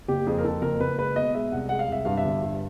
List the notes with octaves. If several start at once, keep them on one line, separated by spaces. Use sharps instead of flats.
F#1 G4
F2 G#4
A#4
F2 A4
F#1 A#4
F#1 B4
G#3 B4
B2 D#5
G#3 E5
C2 F#5
G#3 F#5
F5
C2 E5
G2 F5
E5
G1
G2